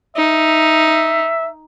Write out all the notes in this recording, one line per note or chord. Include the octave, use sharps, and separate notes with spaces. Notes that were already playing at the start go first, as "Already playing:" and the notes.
D#4 E5